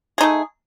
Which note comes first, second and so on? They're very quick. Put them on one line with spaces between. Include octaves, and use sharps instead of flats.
G#4 D#4 A3